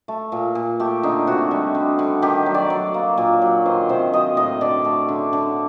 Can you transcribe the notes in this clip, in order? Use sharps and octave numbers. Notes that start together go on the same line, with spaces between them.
A3
A#2
A#2
A3 G4
D3 D#4
C3 F#4
G3
D3
D3
D#3 G4
F#3
D5
F#3
A#3
A#2
F#3
D#3 C5
C3 C5
F#3 D#5
A2 D#5
D3 D5
A3
D3
D3